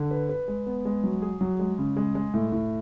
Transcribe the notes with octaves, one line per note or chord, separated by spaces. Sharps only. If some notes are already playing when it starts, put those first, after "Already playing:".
Already playing: D3
B4
B4
G#3
B3
G#3
F#3
G#4
F#3
G#3
C#3
G#3
G#3
A2
A2